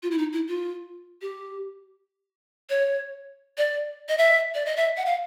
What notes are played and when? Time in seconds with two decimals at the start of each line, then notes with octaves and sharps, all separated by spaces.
0.03 F4
0.11 E4
0.18 D#4
0.33 E4
0.48 F4
1.22 G4
2.70 C#5
3.58 D5
4.09 D#5
4.18 E5
4.54 D5
4.66 D#5
4.77 E5
4.97 F#5
5.06 F5